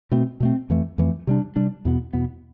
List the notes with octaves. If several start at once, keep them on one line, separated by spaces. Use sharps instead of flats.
B2 A3 C4
B2 A3 C4
F2 E3 A3
F2 E3 A3
C3 G3 D4
C3 G3 D4
E2 B2 B3
E2 B2 B3